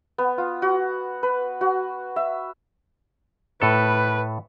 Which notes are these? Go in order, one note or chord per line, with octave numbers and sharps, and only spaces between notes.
B3
F4
F#4
B4
F#4
E5
A2 A4 B4